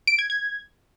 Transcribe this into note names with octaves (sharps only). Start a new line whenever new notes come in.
D7
G#6
G#6